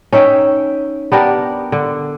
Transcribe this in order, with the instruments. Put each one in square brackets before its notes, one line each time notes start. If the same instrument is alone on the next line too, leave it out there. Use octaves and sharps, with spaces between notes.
[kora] C#4 D#4 E5 G5
B3 D4 G4 A#4
D3